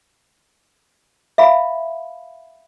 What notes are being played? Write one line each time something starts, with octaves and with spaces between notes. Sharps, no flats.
E5 F5 B5